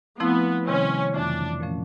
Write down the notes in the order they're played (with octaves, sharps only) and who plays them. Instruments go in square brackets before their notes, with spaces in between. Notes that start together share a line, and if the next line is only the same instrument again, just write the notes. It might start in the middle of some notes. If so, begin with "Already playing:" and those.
[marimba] F3 A3 C4 E4 [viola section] B3
[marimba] C3 D#3 G3 C4 [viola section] C#4
[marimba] F2 C#3 E3 A3 [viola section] D4
[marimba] A#2 F3 A3 C#4